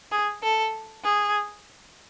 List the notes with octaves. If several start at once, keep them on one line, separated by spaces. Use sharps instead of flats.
G#4
A4
G#4